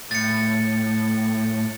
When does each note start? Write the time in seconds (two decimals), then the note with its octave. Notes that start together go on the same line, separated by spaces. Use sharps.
0.11 A2 A6 C#7